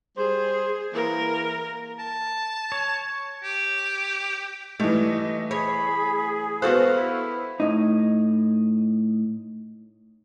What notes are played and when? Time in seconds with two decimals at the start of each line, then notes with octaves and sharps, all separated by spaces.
0.18 G3 G#4 C5
0.94 E3 A#3 A#4
1.99 A5
2.72 C#5
3.43 G4
4.80 E3 G3 A3 D#5
5.51 G#4 C#5 B5
6.62 B3 F#4 A4 C5 F5 F#6
6.96 E4
7.60 A2 D#4